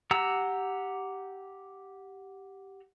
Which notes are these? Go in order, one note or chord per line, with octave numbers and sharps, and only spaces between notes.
G4 F#5 A#5 E6